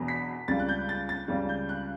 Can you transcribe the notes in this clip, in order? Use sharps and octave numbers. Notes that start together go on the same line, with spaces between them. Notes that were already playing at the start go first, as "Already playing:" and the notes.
Already playing: E1 E2 B2 F#3 B3
B6
C#2 C#3 G3 A6
F#6
G6
A6
A6
C#2 C#3 G3
G6
F#6